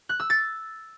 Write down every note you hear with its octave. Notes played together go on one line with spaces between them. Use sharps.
F#6
E6
A6